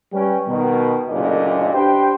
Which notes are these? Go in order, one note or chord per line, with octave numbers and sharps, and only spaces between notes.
G3 C#4 B4 G5
B2 D#3
F#1 D2 A#2 D#5
D4 G4 B4 C5 G5